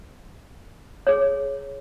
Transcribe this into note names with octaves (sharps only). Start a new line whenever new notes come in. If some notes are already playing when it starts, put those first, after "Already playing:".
G#4 C#5